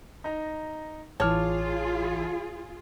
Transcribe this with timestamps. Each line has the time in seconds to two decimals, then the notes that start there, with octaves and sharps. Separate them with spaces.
0.24 D#4 A#5
1.20 A1 E3 F4 G#4 C#5 A5 D6 F6